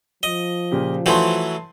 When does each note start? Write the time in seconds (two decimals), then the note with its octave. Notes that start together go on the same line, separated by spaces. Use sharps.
0.23 F3 D#5
0.72 A#2 C#3 G4
1.06 E3 F#3 A3 A5 C6 G6